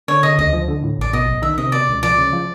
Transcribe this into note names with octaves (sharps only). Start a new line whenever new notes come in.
D3 C#5
C#3 D#5
D2 D#5
F3
D3
A2
A1 D5
B2 D#5
B1
D#3 E5
C3 D#5
B2 D5
C#2
F3 D5
C#3
F3